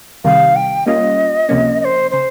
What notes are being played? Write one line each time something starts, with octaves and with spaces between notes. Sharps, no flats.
C2 C3 D#3 G3 F5
G5
G3 A#3 C#4 F4 D#5
C#2 C3 F3 A#3 C#4
D#5
C5
C#3 C5